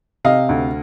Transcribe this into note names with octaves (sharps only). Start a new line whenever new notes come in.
C3 D#5 F5
D2